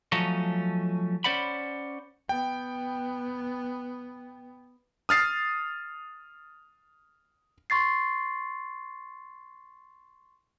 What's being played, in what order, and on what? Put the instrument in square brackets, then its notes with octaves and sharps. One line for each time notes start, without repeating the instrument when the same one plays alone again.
[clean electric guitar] F3 F#3 A3 C#4 C#5 D#5
C#4 C5 D5 F#5 B5
[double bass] B3 [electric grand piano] G5
[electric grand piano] D#6 F6 A6 C7
[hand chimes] C6 C#6 A6 C7